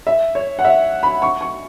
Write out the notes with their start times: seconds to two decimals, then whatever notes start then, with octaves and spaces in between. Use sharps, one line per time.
0.07 E5
0.35 C#5
0.59 F#5
0.65 E5
1.03 B5
1.22 C#6
1.41 C#6